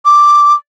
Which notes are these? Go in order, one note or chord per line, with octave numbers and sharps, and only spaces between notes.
D6